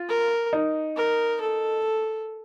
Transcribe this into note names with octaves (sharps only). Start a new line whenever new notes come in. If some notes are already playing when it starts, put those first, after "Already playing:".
Already playing: F4
A#4
D#4
A#4
A4